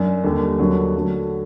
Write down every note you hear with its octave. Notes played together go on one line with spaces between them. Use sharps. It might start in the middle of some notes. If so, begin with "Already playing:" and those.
Already playing: F#2 D4
D#2 D3 G3
D#2 D3 F#3
D3 F#3 A3